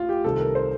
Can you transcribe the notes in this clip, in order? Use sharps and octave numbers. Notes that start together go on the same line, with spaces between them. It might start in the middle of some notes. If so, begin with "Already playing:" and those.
Already playing: A1 F4
G4
C2 C3 D#3 A4
A#4
C5